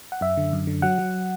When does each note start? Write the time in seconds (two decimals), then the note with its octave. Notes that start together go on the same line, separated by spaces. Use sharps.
0.12 F#5
0.21 F#2 E5
0.37 D3
0.53 F#2
0.67 D3
0.82 F#3 F#5
0.98 F#3